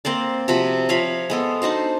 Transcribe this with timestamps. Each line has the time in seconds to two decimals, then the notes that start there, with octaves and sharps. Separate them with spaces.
0.05 A#3 C4 C5 D5
0.48 C3 F3 F#4 B5
0.89 F3 C#5 F5 B5
1.30 G#3 B3 A4
1.62 D4 D#4 F#4 C5